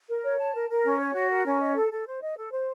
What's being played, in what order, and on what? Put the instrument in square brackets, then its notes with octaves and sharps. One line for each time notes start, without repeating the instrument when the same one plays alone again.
[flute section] A#4
C#5
A5
A#4
A#4
C#4
C#5
F#4
A#4
C#4
D#5
A4
A4
C5
D#5
A4
C5